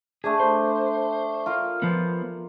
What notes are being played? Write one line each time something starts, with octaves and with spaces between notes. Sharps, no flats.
A3 D4 G#4 A5
C5
F4 A#4
F3 B3